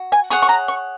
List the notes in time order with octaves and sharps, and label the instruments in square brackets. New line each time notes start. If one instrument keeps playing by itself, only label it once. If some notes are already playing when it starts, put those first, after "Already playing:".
Already playing: [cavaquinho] F#4
[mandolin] G#5
[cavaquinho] G#4 C#5 F#5 [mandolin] C#6
[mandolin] C#6
A#5
C#6